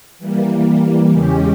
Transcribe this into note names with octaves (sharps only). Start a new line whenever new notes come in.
E3 G3 A#3
E2 C#3 G#3 C#4 G4